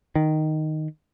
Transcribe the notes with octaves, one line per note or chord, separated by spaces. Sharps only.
D#3